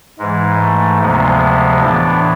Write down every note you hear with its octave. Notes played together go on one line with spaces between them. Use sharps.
G#2 E3 G#3
A3
D2 C3 F3 G#3 B3
A2 E3 B3 D4